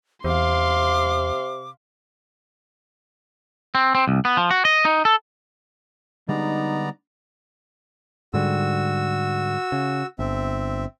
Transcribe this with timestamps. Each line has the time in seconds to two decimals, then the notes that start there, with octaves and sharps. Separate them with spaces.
0.24 E2 C3 F5 C6 D6
3.75 C4
3.95 C4
4.08 C2
4.25 B3
4.37 F3
4.51 F#4
4.65 D#5
4.85 D#4
5.05 A4
6.29 D3 G3 G#3 B3 D#4 D5 A#5
8.34 G#2 D3 G3 F#4 E6
9.72 C#3
10.19 G1 C4 E5